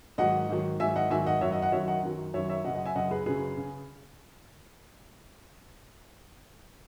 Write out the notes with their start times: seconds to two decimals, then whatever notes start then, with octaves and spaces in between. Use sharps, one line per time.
0.18 G#2 D#3 F#3 D#5 F#5
0.49 G#2 D#3 F#3
0.80 G#2 D#3 F#3 E5 G#5
0.96 D#5 F#5
1.10 G#2 D#3 F#3 E5 G#5
1.26 D#5 F#5
1.41 F#2 D#3 F#3 C#5 E5
1.51 D#5 F#5
1.62 D#5 F#5
1.72 F#2 D#3 F#3 C#5 E5
1.87 D#5 F#5
2.03 F#2 D#3 F#3
2.34 F#2 D#3 F#3 C#5 E5
2.49 C#5 E5
2.64 F#2 C#3 F#3 D#5 F#5
2.75 D#5 F#5
2.85 E5 G#5
2.96 F#2 C#3 F#3 D#5 F#5
3.11 G#4 B4
3.26 F#2 C#3 F#3 G#4 B4
3.57 C#3